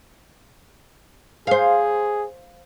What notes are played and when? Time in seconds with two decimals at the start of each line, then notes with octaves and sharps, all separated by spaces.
1.47 G#4 C5 F5